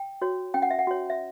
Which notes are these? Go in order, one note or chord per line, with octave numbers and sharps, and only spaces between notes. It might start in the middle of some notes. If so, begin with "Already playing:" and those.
Already playing: G5
F#4 C#5
C#4 G5
F#5
E5
F#5
F#4 C#5
E5